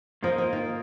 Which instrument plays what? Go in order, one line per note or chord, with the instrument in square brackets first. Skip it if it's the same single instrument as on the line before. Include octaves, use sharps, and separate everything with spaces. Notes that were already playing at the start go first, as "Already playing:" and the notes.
[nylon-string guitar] F2 F3 [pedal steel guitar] A#3 F4 A#4 D#5
[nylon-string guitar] F2 F3
D#3